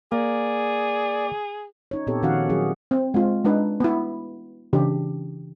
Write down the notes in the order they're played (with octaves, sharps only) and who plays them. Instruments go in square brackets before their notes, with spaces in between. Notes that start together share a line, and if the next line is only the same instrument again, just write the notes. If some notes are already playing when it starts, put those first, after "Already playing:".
[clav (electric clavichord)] A#3 [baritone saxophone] G#4 [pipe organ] D5
[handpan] C#4 D#4 C#5
A#2 B3 C4 G4 A4 C#5
D#3 F3 C#4 F#4 F5 F#5
F#3 C#4 E4 G#4
[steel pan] C4
G#3 C4 F4
G#3 D4 D#4 B4
B3 E4
C#3 E3 D4 G4